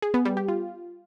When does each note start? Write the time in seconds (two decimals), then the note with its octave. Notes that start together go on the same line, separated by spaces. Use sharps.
0.02 G#4
0.14 B3
0.25 G3
0.37 G4
0.48 F4